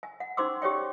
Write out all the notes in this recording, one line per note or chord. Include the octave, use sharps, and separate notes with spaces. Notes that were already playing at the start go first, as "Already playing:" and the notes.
G#5
F#5
C#4 D#4 C5 C6 D6 E6
G4 C#5 D5 G5